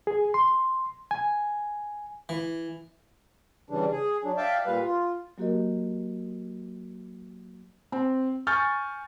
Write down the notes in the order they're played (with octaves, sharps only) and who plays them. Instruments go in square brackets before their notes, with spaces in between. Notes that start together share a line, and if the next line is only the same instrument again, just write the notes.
[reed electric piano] G#4
C6
G#5
[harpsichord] E3
[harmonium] C#3 E3 G3 D4
G#4
F#3 D4
D5 E5 F5 G5 A5
A#2 G3 B4 F5
F4
[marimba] F#3 A#3 F#4 G4 A#4 D#5
[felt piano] C4
G#5 C#6 F6 G6 A6